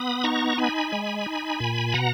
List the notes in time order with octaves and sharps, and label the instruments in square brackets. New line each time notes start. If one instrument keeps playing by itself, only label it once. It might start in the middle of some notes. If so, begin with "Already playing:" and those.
Already playing: [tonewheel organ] B3 B5 D#6
D#4 A#5 C#6
D#4 G#5 B5
G#3
D#4
A#2
B2 F#5 A#5